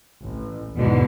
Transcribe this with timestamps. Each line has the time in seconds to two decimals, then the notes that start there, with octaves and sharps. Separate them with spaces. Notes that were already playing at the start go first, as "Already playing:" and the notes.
0.21 A1
0.75 E2 G#2 B2 D3